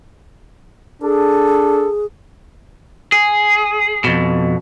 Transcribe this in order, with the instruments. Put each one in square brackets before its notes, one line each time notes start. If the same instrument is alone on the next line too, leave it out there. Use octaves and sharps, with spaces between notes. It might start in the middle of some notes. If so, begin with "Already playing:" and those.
[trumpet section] D4 A4 [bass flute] G#4
[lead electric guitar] G#4
F2 B2